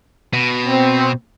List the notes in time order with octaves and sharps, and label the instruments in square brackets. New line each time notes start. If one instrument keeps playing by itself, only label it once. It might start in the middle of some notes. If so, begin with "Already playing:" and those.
[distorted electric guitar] B2
[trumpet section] C4